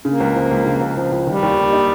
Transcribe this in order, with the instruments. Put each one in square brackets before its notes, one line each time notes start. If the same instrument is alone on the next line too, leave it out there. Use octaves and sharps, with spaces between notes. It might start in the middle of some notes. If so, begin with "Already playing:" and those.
[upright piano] C#3 [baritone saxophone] A#3
[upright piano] C#2
F3
C#2
C#3
C#2
F3
C#2
[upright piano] D#3 [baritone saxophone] G3
[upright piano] D#2
A#3
D#4